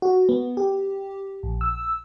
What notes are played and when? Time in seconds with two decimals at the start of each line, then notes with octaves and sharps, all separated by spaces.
0.02 F#4
0.29 B3
0.57 G4
1.43 A#1
1.61 E6